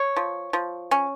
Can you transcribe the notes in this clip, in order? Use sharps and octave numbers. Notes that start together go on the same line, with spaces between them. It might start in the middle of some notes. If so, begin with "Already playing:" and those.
Already playing: C#5
F3
F3
C#4